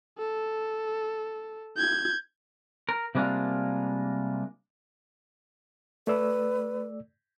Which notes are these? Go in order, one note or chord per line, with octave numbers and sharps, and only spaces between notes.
A4
G6 G#6
A#4
C3 G3 G#3 A#3 D4 F4
A3 B4 D5 E6